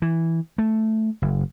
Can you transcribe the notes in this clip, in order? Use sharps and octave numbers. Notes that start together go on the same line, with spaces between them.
E3
A3
F#1